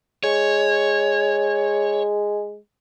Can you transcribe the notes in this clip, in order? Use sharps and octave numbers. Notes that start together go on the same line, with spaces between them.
G#3 C#5